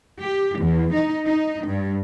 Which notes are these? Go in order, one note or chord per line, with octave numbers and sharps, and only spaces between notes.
G4
E2
D#4
D#4
G2